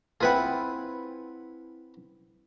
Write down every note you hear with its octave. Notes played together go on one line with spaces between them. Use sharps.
C4 E4 F4 G#4 B4 F#5